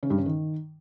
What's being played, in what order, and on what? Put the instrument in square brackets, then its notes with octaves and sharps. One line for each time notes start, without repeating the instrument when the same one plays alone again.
[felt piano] C#3
G2
C#3
D#3